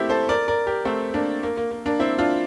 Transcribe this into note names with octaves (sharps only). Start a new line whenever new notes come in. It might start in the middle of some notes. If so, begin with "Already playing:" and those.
Already playing: A3 A#3 C4 E4 G4
A4 C5
A#4 D5
A#4 D5
G4 A#4
A3 C4
A#3 D4
A#3
A#3
A#3
A#3 D4
C4 E4
D4 F4